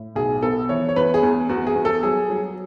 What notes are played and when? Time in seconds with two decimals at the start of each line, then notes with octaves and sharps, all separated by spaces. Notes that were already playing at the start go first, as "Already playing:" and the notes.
Already playing: A2
0.15 B1 G#4
0.42 B3 A4
0.69 E3 C#5
0.89 C#5
0.96 E2 B4
1.14 G#4
1.23 E2
1.49 E2 F#4
1.67 G#4
1.76 E2
1.85 A4
2.03 F#3 G#4
2.30 F#3